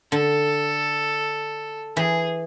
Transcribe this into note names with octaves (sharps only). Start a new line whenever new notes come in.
D3 A4
E3 G#4